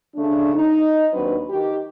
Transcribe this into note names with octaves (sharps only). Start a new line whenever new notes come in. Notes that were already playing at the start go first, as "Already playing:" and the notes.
C#3 A3 D4
D#4
D#2 F#3 C4 D4 B4
D#3 G4